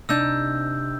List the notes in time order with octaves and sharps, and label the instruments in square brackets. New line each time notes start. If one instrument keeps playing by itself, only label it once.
[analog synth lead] C3 [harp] D4 D#4 [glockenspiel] E6 G6